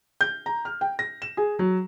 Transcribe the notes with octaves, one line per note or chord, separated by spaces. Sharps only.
G6
A#5
F6
G5
A#6
E7
G#4
F#3